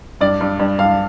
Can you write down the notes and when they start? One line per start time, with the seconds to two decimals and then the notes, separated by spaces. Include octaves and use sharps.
0.21 G2 D5
0.41 G2
0.59 G2
0.79 G2 F5